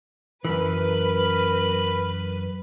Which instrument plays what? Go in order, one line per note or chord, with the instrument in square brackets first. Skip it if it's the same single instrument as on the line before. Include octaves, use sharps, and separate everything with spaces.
[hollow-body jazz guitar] F#2 E3 [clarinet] A#4 [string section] B4 [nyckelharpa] B5